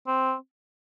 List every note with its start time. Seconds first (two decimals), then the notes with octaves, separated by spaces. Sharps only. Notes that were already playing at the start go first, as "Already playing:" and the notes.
0.07 C4